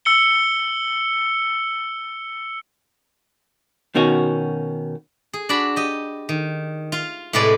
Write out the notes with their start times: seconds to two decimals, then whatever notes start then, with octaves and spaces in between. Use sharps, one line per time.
0.05 E6 C#7 G7
3.95 B2 D#3 C#4 F#4
5.33 G#4
5.49 D4 F#4 D5 B5
5.76 G4 D#5
6.29 D#3
6.92 F4 F5
7.33 A2 C3 G#3 A4 B4 D5